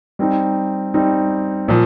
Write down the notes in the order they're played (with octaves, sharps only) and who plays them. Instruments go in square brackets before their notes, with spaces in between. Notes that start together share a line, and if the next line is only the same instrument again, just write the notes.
[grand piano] G3 C4 D#4
G3 C4 D#4
A#2 F3